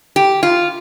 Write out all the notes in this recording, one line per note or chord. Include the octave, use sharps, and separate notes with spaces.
G4
F4